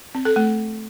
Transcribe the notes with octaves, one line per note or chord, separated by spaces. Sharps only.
C4
A4
A3